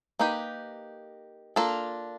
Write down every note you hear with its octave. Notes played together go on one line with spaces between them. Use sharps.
A#3 D#4 G4 B4
A#3 D4 F4 A4